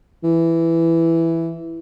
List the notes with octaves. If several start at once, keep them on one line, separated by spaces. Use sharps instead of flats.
E3